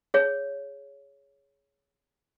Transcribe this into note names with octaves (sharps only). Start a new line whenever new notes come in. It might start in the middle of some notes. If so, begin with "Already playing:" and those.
G#4 C#5